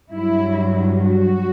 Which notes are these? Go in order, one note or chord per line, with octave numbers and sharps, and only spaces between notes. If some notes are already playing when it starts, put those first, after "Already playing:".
G2 F#3 E4
F#4